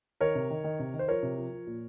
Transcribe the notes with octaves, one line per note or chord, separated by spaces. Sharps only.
D#3 A#4 C#5
C3
D#3
D#3
C3
D#3
C5
F3 A#4 C#5
C3
F3
F3
A#2